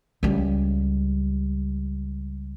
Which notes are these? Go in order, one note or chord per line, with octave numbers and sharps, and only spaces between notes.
C#2 G3